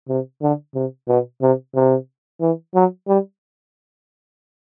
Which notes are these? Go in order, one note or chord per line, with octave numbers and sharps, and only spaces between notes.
C3
D3
C3
B2
C3
C3
E3
F#3
G3